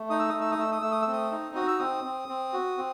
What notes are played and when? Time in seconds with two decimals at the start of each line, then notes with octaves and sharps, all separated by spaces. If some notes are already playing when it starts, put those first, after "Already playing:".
Already playing: A3
0.10 D#4 D#6
0.19 E6
0.29 A3 D#6
0.41 E6
0.51 D#6
0.59 A3 E6
0.72 D#6
0.82 A3 E6
0.91 D#6
1.02 E6
1.07 C4
1.12 D#6
1.32 D#4
1.55 F#4 D#6
1.68 E6
1.79 C4 D#6
2.04 C4
2.29 C4
2.53 F#4
2.78 C4